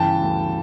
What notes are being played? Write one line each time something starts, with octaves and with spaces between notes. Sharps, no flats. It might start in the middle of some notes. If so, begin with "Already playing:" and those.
Already playing: G1 C#3 E3 G5 A5
D2